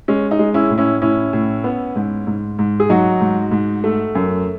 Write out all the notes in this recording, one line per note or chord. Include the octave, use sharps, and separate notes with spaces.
G#3 C#4
D#4
G#3
C#4 E4
A2
C#4 E4
A2 C#4 E4
A2
B3
G#2
G#2
G#2
G#4
F#3 D#4 F#4
G#2
G#2
A3
F#2